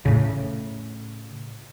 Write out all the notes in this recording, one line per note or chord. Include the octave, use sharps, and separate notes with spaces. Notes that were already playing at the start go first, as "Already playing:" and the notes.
A2 C#3